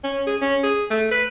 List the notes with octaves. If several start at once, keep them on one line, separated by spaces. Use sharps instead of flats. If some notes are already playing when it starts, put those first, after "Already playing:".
C#4
G#4
C#4
G#4
A3
B4